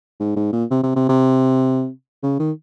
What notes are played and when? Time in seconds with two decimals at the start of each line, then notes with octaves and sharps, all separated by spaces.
0.20 G#2
0.36 G#2
0.53 A#2
0.71 C3
0.83 C3
0.96 C3
1.09 C3
2.23 C#3
2.39 D#3